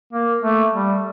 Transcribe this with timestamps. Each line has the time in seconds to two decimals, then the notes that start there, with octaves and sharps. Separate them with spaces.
0.13 A#3
0.43 A3
0.73 G3